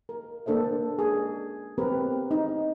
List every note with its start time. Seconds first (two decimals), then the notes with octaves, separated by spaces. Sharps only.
0.09 A#4
0.46 A#3 D4 A4 C5 E5
0.99 G#4
1.78 B3 C4 G4 A#4 B4
2.31 D#4